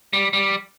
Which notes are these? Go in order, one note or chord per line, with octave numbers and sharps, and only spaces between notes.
G3
G3